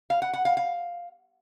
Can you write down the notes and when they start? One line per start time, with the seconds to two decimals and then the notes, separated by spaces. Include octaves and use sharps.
0.10 F5
0.22 F#5
0.33 F#5
0.45 F5
0.57 F5